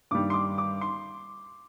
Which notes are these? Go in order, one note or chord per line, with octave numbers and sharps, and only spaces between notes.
G2 D#3 G3 D6
C6
D6
D6
C6